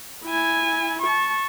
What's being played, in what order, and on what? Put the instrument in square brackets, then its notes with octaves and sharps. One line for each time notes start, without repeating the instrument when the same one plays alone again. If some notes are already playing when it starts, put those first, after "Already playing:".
[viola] E4 G#5
A5 C#6